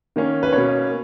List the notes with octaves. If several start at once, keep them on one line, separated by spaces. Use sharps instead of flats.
D#3 A#3 C#4
B4
B2 A#3 C#4 C#5